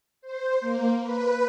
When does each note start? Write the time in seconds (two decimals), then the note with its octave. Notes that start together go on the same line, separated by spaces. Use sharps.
0.21 C5
0.60 A#3
1.00 B4